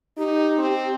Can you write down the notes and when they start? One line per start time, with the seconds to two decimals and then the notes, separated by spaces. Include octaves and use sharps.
0.18 D#4 G4
0.58 C4